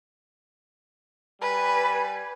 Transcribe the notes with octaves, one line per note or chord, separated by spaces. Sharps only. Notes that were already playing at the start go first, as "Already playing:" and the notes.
G3 B4 G#5